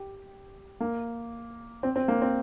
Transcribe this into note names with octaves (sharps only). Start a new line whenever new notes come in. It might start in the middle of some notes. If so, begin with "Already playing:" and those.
Already playing: G4
A#3
C4
C4
A#3
C4